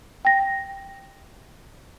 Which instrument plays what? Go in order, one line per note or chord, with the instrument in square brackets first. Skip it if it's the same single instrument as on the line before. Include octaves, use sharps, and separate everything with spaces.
[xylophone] G5 A#6